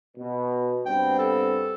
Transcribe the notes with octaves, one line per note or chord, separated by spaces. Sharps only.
B2
G2 B3 C4 G5
A4